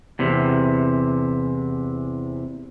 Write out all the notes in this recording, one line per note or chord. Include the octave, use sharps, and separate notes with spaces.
E2 C3